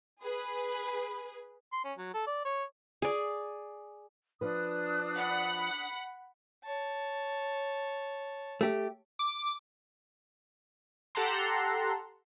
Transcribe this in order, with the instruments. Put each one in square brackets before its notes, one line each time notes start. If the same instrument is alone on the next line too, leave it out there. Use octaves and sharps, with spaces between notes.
[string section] G#4 B4 [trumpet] B5
[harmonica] C6
C#4
F#3
A4
D5
C#5
[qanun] G#4 D5
[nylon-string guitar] F3 B4 [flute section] D4 D#6 F#6
[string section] F#5 B5
[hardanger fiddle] C#5 A5
[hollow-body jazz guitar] A3 G4
[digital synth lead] D6
[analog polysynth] G4 A4 F#5 A5 A#5 C6